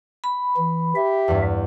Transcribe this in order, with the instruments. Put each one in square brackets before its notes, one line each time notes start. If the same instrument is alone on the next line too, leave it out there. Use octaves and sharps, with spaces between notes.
[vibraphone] B5
[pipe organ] E3
[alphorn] G4 [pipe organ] E5
[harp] E2 G2